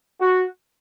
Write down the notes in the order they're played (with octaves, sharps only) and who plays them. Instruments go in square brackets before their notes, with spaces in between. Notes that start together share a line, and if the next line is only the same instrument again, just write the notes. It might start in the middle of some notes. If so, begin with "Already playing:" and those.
[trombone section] F#4